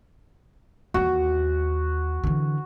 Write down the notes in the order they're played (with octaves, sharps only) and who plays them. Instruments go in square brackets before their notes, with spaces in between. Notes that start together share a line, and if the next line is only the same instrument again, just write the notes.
[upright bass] D#2 E3 [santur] F#4
[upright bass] D3 E3